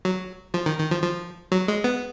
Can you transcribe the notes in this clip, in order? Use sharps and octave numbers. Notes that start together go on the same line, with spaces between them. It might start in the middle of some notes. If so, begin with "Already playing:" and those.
F#3
F3
D#3
D#3
F3
F3
F#3
G#3
B3